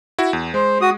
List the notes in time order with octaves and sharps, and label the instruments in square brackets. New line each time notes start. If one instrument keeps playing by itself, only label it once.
[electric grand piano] E4 F#4
E2
[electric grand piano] G#3 [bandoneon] C5
[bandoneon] F#4 D#6